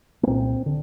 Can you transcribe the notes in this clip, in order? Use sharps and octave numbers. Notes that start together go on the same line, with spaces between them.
A#3
C2 A#2 C4
D3